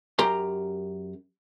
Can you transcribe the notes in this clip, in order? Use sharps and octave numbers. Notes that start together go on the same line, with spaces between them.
F#2 G4 A#4 A#5 C6